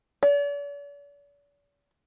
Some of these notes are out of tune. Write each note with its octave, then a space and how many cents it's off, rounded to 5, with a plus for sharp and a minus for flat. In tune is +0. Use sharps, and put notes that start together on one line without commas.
D5 -45